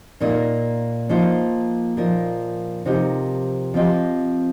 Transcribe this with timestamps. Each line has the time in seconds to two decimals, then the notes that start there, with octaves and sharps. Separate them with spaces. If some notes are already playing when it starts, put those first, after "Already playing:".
0.20 A#2 A#3 D#4 A#4
1.09 F3 A#3 D#4 C5
1.97 A#2 F3 D#4 A#4
2.85 C3 F3 D#4 G4 A#4
3.74 F3 C4 G4 D#5